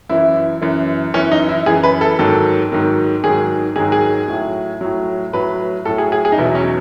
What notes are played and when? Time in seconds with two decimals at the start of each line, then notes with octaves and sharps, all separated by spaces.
0.09 F#2 E3 E4
0.61 F#2 E3
1.14 F#2 E3 C#4
1.31 D#4
1.49 E4
1.66 F#2 E3 G#4
1.83 B4
2.01 A4
2.19 G#2 D#3 F#3 A4
2.72 G#2 D#3 F#3
3.24 G#2 D#3 F#3 G#4
3.76 G#2 D#3 F#3 G#4
3.84 F#4
3.92 G#4
4.28 A2 F#3
4.81 A2 F#3
5.33 A2 F#3 B4
5.85 A2 F#3 A4
5.98 G#4
6.12 G#4
6.25 G#4
6.32 D#4
6.38 E2 B2 F#3 E4
6.55 C#4